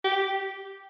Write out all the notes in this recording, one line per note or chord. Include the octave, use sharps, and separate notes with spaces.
G4